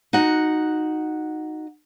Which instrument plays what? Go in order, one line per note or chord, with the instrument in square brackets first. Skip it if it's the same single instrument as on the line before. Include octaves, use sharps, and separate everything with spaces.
[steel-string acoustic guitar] D#4 F#4 F#5